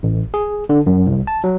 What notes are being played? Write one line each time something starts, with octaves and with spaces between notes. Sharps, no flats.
A1
G#4
D3
F#2
C2
A5
F#3